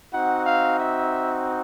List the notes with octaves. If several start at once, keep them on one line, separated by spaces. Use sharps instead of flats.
C4 D#4 F#4 F#5
F5
E5